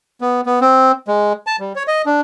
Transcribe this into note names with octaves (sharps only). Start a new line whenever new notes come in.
B3
B3
C4
G#3
A5
G3
C#5
D#5
D4